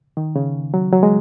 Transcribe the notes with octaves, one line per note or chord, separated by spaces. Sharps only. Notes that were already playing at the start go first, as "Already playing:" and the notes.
D#3
C#3
F#3
F#3
G#3